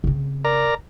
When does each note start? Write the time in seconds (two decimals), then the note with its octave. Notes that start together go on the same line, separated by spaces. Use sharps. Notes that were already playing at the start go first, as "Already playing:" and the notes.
0.04 C#3 C4
0.45 A#4 D5 A#5